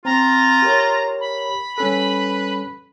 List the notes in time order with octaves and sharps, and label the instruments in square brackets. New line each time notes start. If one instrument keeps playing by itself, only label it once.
[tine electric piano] C4 [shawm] F4 [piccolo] A#5
[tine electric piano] G4 A#4 C#5
[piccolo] B5
[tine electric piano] G3 C#4 A4 [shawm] B4